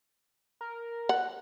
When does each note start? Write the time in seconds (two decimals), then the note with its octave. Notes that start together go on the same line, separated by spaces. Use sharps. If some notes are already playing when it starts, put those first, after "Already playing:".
0.61 A#4
1.09 F#5